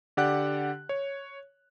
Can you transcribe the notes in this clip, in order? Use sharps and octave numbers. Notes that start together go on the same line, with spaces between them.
D3 G4 D5 F#5 F#6
C#5